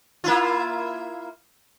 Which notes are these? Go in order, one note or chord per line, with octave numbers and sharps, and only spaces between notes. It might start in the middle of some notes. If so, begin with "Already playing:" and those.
A#3 E4 F4